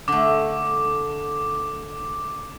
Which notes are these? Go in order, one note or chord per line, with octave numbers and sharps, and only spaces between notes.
D3 A3 D6